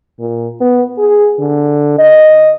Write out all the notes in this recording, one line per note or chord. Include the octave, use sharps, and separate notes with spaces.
A#2
B3
G#4
D3
D#5